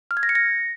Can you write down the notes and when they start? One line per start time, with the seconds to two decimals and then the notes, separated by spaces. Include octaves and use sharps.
0.11 F6
0.17 G#6
0.23 A#6
0.29 C#7
0.35 A#6